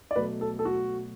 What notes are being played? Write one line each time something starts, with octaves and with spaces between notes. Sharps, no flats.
D5
B2 F#3 A3 B4
A4
A4
F#4